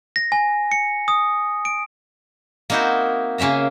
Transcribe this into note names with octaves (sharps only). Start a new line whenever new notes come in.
A#6
G#5
C#7
D#6
D7
A#3 C4 D#4 E4 F#4 C5
C#3 A#3 C#4 E5 A#5